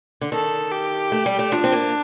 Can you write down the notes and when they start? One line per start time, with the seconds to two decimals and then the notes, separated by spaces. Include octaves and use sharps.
0.21 D3
0.32 D#3 A4
0.72 G4
1.12 A3
1.26 G3
1.39 A3
1.52 F3 D4
1.64 C4
1.72 A#3